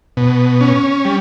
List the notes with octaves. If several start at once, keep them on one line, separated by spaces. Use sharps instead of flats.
B2
C#4
G3